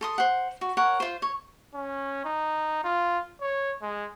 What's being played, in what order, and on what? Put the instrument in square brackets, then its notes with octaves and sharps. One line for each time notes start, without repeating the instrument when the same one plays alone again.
[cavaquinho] A4 C6 D#6
C5 F#5
F#4
A#4 C#5 F#5
F4 C5
C#5
[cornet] C#4
D#4
F4
C#5
G#3